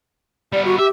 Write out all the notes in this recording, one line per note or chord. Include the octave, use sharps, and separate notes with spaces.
G3 B3 D5
F#4
G4 E5